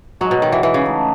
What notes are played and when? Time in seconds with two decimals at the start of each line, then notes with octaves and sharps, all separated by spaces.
0.21 F#3 G#3 D#4 F#4 C#5
0.31 B2
0.42 D#3
0.52 E3
0.63 E3
0.74 C#3
0.85 A3 D#4 G#4